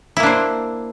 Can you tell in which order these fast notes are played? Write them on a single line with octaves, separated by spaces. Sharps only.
E4 A#3 D4 C5